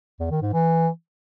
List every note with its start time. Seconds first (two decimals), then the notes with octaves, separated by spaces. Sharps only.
0.20 E2
0.31 D#3
0.42 G#2
0.53 E3